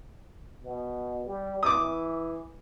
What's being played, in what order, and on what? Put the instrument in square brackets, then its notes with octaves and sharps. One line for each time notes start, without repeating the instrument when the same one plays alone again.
[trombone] B2
G3
[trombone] E3 [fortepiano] D6 D#6